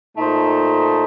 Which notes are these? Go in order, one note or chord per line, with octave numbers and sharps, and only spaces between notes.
A#2 A3 D#4 A4 C5